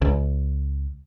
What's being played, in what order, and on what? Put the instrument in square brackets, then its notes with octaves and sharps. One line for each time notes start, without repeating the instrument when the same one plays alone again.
[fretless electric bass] C#2